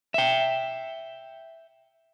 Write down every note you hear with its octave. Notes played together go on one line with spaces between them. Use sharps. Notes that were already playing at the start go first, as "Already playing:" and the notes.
E5 G5